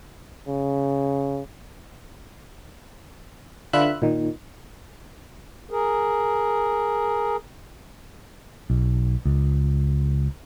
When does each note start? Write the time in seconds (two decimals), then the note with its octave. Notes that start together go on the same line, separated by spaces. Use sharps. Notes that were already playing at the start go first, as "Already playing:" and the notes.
0.48 C#3
3.73 D3 F4 B4 E5 F#6
4.02 A#2 D#3
5.70 G#4 A#4
8.70 B1
9.26 C#2